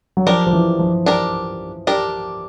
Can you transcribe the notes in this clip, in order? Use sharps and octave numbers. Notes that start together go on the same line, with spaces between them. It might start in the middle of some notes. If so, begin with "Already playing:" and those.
F#3
F3 D4 G4 A#4
F3
E3
F3
D4 G4 A#4
D4 G4 A#4